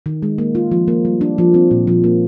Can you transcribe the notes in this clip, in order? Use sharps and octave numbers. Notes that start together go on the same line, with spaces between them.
D#3
G#3
A#3
F4
F3
A#3
G3
D4
F3
C4
A#2
F3
A#3